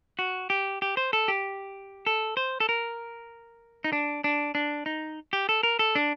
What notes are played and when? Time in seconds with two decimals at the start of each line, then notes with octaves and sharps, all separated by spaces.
0.19 F#4
0.50 G4
0.82 G4
0.97 C5
1.13 A4
1.28 G4
2.07 A4
2.37 C5
2.60 A4
2.69 A#4
3.84 D#4
3.93 D4
4.24 D4
4.55 D4
4.86 D#4
5.33 G4
5.49 A4
5.63 A#4
5.79 A4
5.95 D4